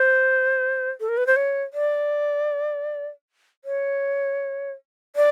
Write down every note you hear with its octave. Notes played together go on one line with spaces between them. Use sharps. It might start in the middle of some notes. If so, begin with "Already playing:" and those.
Already playing: C5
A4
A#4
B4
C5
C#5
D5
C#5
D5